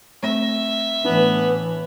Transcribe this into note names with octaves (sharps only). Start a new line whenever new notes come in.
A3 C4 E5 A#6
A2 E3 B3 D4